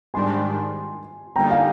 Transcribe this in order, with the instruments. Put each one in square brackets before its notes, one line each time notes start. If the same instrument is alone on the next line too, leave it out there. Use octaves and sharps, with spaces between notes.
[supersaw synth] G#2 D#3 G3 D4 [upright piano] G#5 C6
[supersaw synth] D3 G3 A#3 D#4 [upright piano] G5 A#5
[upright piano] F5 G#5